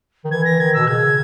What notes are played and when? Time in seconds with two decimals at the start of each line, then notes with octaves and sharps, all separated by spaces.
0.25 D#3
0.31 E3 G#6
0.45 A#6
0.60 D#3 G#6
0.74 B2 E6
0.87 C#3 G#6